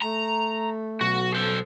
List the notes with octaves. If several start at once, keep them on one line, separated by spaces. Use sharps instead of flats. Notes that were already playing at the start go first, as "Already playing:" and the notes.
A3 A#5
B1 F#4
A4 C5